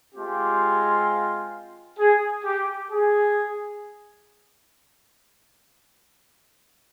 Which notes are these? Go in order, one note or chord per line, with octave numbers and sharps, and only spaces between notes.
G#3 C4 F4 G4
G#4
G4
G#4